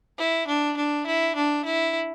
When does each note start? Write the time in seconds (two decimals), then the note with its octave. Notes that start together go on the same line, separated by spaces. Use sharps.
0.18 E4
0.47 D4
0.77 D4
1.06 E4
1.36 D4
1.65 E4